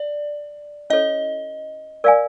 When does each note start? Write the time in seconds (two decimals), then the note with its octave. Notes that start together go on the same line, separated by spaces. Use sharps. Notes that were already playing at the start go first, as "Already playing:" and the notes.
Already playing: D5
0.90 C#4 E4 A4 C#5 D#5
2.04 A#4 D5 F5 G#5